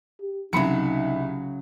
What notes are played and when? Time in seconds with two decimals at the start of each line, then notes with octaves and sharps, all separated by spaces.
0.21 G4
0.53 C2 C#3 F#3 D#4 B5 C#7